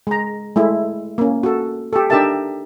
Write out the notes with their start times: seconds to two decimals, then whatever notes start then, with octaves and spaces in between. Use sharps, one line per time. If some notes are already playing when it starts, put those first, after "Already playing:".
0.07 G#3 A#5
0.56 G#3 A3 E4
1.18 A#3 C#4
1.43 F#4 A4
1.93 G4 A4
2.10 D4 D#4 G4 A#4 E5 A5